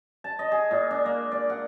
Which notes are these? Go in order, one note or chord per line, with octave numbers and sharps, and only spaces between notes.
A5
D#5
G#4
A#2
D4
A#3
D5
F#5